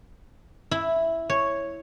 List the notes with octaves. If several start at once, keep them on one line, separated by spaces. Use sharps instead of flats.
E4
C#5